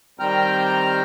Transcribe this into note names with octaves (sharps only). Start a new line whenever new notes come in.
D#3 G3 C4 G5 A#5 F6